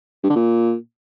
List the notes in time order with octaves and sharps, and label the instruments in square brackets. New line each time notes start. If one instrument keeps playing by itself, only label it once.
[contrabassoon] G2
D3
A#2